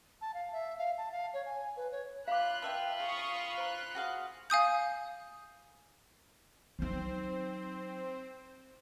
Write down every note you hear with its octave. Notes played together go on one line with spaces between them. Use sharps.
A5
F5
E5
F5
A5
F5
C#5
G#5
B4
C#5
F4 F5 B5 D6 F#6
B4 E5 G5 A5
G#4 F5 C#6 D#6
C5 A#5 F#6
F#4 G#4 F5
F5 G#5 D#6 G6
F#3 C4 D#4 C5